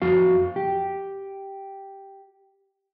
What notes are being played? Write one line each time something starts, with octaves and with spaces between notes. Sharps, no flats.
F2 F#4 F5
G4